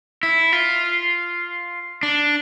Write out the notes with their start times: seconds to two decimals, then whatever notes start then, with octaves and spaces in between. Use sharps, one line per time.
0.23 E4
0.53 F4
2.03 D4